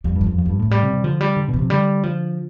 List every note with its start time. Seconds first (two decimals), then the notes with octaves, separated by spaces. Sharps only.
0.04 F2 G3
0.16 G2
0.21 F3
0.26 F2
0.38 F2
0.46 G3
0.50 G2
0.59 A2
0.62 F3
0.70 A2 G3
0.83 C3
0.93 C3
1.04 D3 F3
1.21 G3
1.37 D3
1.49 B2
1.54 F3
1.59 C3
1.70 D3 G3
2.03 F3